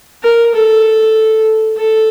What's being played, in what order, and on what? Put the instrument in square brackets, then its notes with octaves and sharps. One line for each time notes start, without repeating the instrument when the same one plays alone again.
[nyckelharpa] A#4
A4
A4